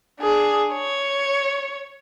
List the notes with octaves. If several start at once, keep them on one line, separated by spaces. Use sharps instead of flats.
D4 G#4
C#5